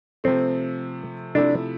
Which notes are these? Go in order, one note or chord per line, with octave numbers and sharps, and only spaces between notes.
C3 F3 A3 C4
C3 F3 A3 D4 E4